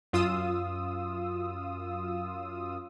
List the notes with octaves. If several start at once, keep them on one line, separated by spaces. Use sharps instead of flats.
F#2 F4 D#6 E6